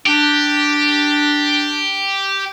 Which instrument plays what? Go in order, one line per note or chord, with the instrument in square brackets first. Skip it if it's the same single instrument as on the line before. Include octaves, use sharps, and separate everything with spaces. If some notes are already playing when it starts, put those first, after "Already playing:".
[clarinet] D4 [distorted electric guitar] G4